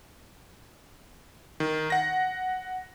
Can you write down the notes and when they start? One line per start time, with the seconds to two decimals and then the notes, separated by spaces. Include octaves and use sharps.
1.60 D#3
1.90 F#5 A#6